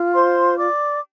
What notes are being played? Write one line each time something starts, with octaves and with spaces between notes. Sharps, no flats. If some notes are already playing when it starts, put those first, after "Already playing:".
Already playing: F4
C5 C6
D5 D6